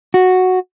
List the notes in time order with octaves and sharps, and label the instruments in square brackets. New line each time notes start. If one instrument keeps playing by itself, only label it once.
[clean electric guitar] F#4